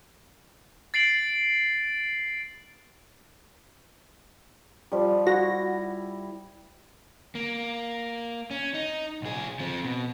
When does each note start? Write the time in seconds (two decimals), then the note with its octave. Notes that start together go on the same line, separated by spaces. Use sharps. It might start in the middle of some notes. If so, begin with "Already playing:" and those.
0.94 A6 C7 D7 F#7
4.92 F3 G3
5.27 E4 F#4 A#6
7.35 A#3
8.51 C#4
8.74 D#4
9.22 B1 G#4
9.60 F3 C4
9.85 B2